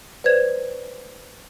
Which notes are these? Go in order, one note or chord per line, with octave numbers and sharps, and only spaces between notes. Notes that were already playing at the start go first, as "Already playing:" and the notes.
B4 C5 D5 G#6